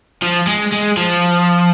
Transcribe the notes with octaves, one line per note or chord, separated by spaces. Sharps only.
F3
G#3
G#3
F3